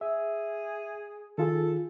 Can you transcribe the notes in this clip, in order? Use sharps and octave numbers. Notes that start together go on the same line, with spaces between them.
G#4 E5
D#3 F4 G#4 A4